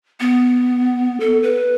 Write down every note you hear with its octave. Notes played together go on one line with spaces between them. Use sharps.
B3
A4
B4